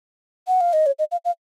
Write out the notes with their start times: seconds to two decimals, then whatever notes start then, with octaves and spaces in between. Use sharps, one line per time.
0.48 F#5
0.61 F5
0.73 D#5
0.86 C#5
0.99 D#5
1.12 F5
1.25 F5